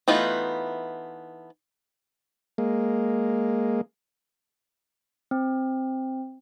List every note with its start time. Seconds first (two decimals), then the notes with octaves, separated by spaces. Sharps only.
0.08 E3 A3 B3 D#4 F4
2.58 G#3 A#3
5.31 C4